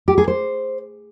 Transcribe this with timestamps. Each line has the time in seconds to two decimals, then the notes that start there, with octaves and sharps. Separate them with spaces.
0.08 G4
0.18 G#4
0.28 C5